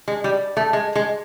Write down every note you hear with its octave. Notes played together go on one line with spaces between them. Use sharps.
G#3
G3
A3
G#3
G#3